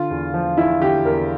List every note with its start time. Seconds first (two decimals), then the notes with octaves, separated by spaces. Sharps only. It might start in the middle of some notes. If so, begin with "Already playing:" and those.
Already playing: D3 F4
0.11 E2
0.34 F3
0.57 E2 E4
0.81 D3 G4
1.05 E2 A#4